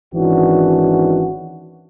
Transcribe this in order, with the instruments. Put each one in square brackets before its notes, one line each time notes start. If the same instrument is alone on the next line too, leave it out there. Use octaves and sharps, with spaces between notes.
[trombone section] G#1 D#3 E3 C#4 D4 F#4